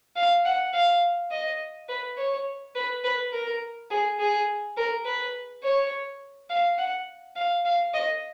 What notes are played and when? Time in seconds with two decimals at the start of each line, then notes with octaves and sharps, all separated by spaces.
0.16 F5
0.45 F#5
0.73 F5
1.31 D#5
1.89 B4
2.18 C#5
2.75 B4
3.04 B4
3.32 A#4
3.90 G#4
4.19 G#4
4.77 A#4
5.06 B4
5.63 C#5
6.50 F5
6.78 F#5
7.36 F5
7.65 F5
7.94 D#5